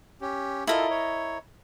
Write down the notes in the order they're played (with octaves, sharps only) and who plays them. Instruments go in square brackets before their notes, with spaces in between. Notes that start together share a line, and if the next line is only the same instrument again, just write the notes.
[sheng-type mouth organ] C#4 G4
[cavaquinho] E4 A#4 D#5 [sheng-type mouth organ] F4 A4
[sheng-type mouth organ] C#5